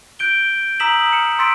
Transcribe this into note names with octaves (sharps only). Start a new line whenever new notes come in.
F#6 G6 D7 G7
A#5 D#6 E6 B6 E7 F#7
F6 C#7 E7
C6 E6 A6 B6 D7